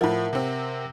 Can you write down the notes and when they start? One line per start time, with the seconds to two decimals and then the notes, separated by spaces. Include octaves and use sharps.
0.01 A2 F3 A#4 E5 F#5
0.33 C3 C4